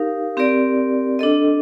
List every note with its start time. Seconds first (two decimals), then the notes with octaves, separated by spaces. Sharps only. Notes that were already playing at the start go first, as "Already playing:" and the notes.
Already playing: D#4 G4 A#4 F5
0.37 C4 G4 A#4 D5
1.19 D4 A4 D#5